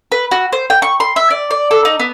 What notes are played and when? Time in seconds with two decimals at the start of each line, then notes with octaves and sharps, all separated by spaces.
0.12 B4
0.31 F#4
0.52 C5
0.70 G5
0.82 C#6
1.00 C6
1.16 E5
1.30 D5
1.51 D5
1.71 A4
1.85 D#4
1.99 B3